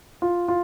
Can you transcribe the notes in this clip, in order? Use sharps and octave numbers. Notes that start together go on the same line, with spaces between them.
F4
F4